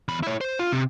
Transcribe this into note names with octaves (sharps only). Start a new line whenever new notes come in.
E2 B5
E4 C#5
C5
F4
C3